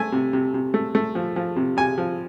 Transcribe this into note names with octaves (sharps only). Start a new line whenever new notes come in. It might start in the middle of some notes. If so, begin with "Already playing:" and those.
Already playing: A3 G#5
C3
C3
C3
A3
A3
F3
F3
C3
C3 G#5
F3